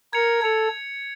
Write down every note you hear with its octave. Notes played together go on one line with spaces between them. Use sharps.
A#4 G#6 C#7 F7
A4 G#6 C#7 F7